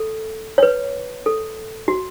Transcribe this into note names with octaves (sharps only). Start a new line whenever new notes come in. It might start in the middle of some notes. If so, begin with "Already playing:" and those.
Already playing: A4
C#5
B4
A4
F#4